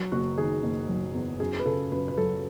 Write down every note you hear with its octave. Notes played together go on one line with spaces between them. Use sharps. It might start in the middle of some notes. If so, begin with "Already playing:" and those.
Already playing: F#3
F#1 F#4
D#3 G#4
F#1
F#3
E2
F#2 G#4
B4
C#3 A4
F#2 B4
B4
F#3 A4